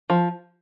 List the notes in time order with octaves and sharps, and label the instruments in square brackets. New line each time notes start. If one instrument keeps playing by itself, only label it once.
[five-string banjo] F3